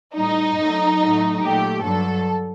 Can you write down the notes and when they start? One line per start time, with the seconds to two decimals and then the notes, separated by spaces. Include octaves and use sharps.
0.16 A2 G3 D#4
0.57 F#2 F#3 A3
1.00 A2 F#3 A3
1.42 A#2 F#3 A3 G4
1.83 G2 D3 F#3 A4